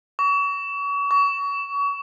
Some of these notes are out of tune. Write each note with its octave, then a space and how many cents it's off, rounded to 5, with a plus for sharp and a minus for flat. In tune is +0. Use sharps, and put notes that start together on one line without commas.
C#6 +35
C#6 +30